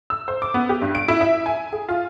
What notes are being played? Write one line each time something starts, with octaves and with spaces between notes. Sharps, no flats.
E6
C5
D6
B3
G4
G2
D7
E4
E5
G#5
G#4
F4